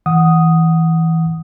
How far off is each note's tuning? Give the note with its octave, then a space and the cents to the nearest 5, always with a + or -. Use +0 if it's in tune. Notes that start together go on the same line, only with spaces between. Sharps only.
E3 -15 F#5 +0 D#6 +0